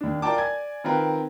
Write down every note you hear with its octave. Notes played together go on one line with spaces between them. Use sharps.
D#2 D4
F4 A#4 D5 G5 A5 D6
D5 G#5 G#6
D#3 C4 F4 A#4 B4